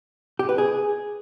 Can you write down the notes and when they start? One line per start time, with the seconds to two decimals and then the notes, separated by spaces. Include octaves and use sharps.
0.39 G4
0.49 B4
0.58 G#4